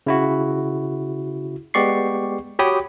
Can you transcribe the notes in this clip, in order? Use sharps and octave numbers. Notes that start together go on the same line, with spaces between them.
C#3 E4 F#4
G#3 B3 G4 D5 C#6 C7
F#4 G4 C#5 G5 B5 D#6